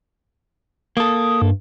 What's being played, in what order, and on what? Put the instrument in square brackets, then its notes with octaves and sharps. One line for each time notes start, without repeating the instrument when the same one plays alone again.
[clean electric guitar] A#3 A4 [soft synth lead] D#6
[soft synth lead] G2